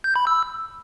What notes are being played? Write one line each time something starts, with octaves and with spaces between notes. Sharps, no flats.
G6
B5
E6